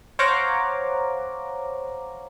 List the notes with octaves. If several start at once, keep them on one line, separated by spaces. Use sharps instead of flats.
C5 C#5 F5 F#5 A#5 D6